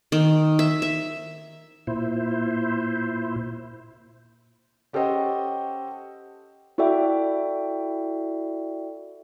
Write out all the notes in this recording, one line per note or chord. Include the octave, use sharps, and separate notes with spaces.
D#3
E5
E5
A#2 E4 C5
C#4 G4 A4 C5 D#5 F#5
E4 F#4 A4 D5 E5 G5